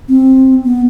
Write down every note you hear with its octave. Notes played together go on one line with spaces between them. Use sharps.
C4
B3